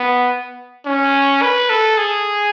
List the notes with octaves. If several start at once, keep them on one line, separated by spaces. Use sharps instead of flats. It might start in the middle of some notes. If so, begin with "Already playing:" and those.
Already playing: B3
C#4
B4
A4
G#4